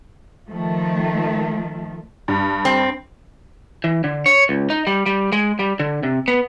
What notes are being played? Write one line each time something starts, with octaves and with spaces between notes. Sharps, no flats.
D#3 F3 A3
G2
C4
E3
D3
C#5
C#2
D#4
G3
G3
G#3
G3
D3
C3
B3